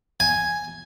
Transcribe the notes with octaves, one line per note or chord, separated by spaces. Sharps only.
G#5